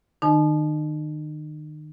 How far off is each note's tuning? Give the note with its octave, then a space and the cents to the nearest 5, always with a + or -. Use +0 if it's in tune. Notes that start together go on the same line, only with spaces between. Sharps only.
D#3 -30 D#4 -40 A5 -35